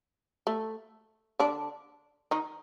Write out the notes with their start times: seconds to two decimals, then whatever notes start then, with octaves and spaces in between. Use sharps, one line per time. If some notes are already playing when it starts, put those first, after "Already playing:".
0.47 A3
1.39 D3 D4
2.31 D#3 D#4